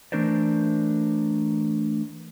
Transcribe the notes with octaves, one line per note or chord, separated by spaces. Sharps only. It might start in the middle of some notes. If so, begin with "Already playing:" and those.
E3 A3 D4 A#4 C5 D5